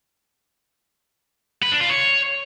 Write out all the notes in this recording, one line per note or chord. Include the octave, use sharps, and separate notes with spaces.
B4
D4
F4
C#5